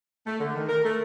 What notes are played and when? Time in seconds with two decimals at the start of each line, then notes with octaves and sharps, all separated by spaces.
0.27 A3
0.39 D3
0.55 D#3
0.69 A#4
0.84 A3